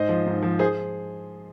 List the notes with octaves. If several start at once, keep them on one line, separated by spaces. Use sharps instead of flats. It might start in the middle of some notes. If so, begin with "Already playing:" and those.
Already playing: G#2 C5 D#5
F3
G#2
F3
G#4 C5